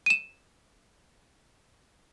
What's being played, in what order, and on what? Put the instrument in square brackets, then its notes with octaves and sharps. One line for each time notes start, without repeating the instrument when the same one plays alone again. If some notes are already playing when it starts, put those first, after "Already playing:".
[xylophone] D#7 E7